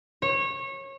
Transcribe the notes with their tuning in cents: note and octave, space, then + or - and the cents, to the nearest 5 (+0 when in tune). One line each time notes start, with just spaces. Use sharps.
C#5 -25